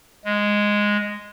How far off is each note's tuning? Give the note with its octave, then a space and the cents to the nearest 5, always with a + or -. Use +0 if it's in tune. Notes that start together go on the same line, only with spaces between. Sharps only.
G#3 -5